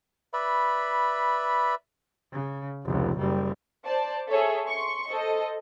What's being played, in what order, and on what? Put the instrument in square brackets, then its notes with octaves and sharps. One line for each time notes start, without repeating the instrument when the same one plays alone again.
[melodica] B4 D5 E5 B5
[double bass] C#3
F1 C#2
F#1 G3
[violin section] C5 D5 A5
G#4 A4 C#5 E5
C6 C#6
A4 C5 D#5